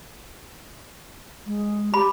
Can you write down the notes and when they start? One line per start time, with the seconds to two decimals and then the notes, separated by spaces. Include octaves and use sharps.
1.46 G#3
1.94 G4 B5